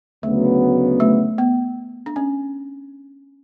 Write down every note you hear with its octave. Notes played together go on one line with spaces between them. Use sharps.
D2 C#3 F#3 A3 B3
A3
B3
D4
C#4